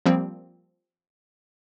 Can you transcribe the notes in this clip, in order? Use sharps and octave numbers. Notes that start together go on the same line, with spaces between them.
F3 G3 A#3 C4